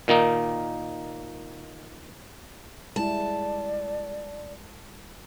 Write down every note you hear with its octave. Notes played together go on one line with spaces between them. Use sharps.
A#2 D#3 A#3 D#4
G3 G#3 E4 D5 A5